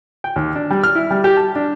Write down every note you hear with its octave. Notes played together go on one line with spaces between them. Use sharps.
G5
D#2
D4
G3
F6
E4
G3
G4
A5
D4